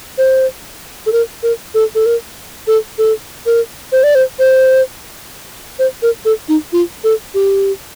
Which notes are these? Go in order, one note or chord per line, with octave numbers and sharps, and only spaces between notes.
C5
A4
A#4
A#4
A4
A4
A#4
A4
A4
A#4
C5
D5
C5
C5
C5
A#4
A4
D#4
F4
A4
G4